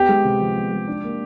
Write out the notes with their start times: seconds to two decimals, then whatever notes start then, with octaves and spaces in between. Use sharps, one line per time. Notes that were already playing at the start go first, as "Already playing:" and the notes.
Already playing: B3 G4
0.09 G#3
0.25 C3
0.41 F3
0.56 B3
0.72 G#3
0.88 D4
1.04 A#3